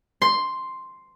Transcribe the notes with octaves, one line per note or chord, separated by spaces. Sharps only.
C6